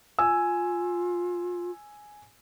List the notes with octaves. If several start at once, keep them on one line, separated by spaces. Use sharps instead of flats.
F4 G#5 E6